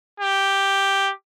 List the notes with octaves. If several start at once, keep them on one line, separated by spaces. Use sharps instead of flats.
G4